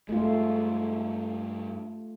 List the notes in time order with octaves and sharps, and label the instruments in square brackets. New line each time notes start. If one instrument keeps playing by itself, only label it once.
[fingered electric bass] G2 G#3 [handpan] A3 F4